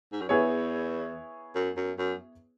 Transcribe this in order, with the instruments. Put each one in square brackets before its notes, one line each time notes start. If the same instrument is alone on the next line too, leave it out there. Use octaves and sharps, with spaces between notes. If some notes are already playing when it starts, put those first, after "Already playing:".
[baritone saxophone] G#2
F#2
[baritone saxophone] E2 [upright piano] B3 E4 G#4 C#5
[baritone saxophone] F#2
F#2
F#2